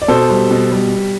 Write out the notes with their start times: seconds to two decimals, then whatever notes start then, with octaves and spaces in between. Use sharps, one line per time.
0.02 D5
0.08 B2 A4 C5
0.30 G3
0.51 B2
0.72 G3